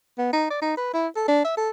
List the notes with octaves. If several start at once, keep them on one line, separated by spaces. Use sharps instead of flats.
B3
D#4
D5
D#4
B4
E4
A4
D4
E5
A4